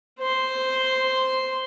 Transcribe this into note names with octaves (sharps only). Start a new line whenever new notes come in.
C5 C6